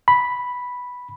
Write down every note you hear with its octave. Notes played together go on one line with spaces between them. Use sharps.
B5